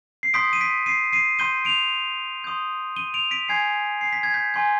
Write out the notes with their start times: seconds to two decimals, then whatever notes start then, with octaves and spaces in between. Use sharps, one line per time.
0.23 C7
0.34 C6 D#6 G6 B6 D7
0.53 D#7
0.61 B6 D7
0.86 C7 D#7
1.13 C7 D#7
1.39 C6 G6 D#7 G7
1.65 D7 F7
2.44 C6 D#6 G6
2.96 D#7 G7
3.14 D7 F7
3.31 B6 D7
3.49 G#5 C6 G6 G#6 C7
4.01 C7
4.13 B6
4.23 G#6
4.34 G6 B6
4.54 G#5 C6 G6